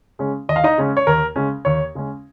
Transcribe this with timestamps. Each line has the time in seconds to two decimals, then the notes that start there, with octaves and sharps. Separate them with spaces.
0.19 C#3 G#3 C#4
0.49 D#2 D#5
0.56 F5
0.64 D#4 D#5
0.78 C#3 G#3 C#4
0.97 C#5
1.07 D#2 A#4
1.36 C#3 G#3 C#4
1.65 D#2 C#5
1.95 C#3 G#3 C#4